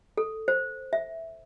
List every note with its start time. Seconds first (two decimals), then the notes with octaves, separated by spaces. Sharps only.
0.17 A4
0.48 C5
0.93 E5